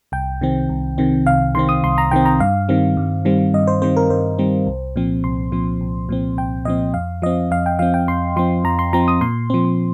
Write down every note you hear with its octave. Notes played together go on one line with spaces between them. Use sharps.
C2 G5
C3 D#3 C4
C2
C3 D#3 C4
C2 F5
C3 D#3 C4 C6
D#6
C2 C6
A#5
C3 D#3 C4 G5
A#5
G2 F5
D#3 G3 C4
G2
D#3 G3 C4
G2 D#5
C5
D#3 G3 C4 C5
A#4
G2 C5
D#3 G3 C4
C2
A#2 F3 C4
C2 C6
A#2 F3 C4
C2
A#2 F3 C4
C2 G5
A#2 F3 C4 D#5
F2 F5
F3 C4 D#5
F2 F5
G5
F3 C4 F5
G5
F2 C6
F3 C4 C6
F2 A#5
C6
F3 C4 A#5
D#6
A#2 C6
F3 C4